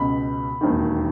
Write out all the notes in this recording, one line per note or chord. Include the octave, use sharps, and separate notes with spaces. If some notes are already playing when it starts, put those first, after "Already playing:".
Already playing: C#2 B2 B5
E1 D#2 D#3